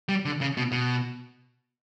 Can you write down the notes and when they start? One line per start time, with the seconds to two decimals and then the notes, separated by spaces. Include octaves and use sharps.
0.09 G3
0.25 D3
0.41 C#3
0.57 B2
0.72 B2